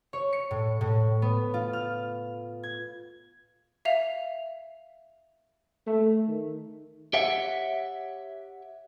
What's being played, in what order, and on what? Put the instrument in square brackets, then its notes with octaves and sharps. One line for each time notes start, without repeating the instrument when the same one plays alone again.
[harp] C#5
C#7
A2
A2
B3
F4
F6
G#6
[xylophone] E5 F5 F7
[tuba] A3
D#3
[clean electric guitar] G4 C#5 E5 F#5